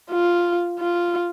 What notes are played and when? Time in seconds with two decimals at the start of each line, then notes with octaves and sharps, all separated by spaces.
0.11 F4
0.80 F4